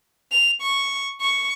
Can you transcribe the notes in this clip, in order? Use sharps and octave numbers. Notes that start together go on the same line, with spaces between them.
F7
C#6
C#6